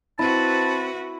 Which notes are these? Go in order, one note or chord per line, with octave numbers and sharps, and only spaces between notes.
C4 E4 F#4 B4 A5